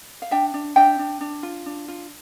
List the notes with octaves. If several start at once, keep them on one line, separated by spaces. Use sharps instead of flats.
F5
D4 E5 G5
D4
D4 E5 G5
D4
D4
F4
D4
F4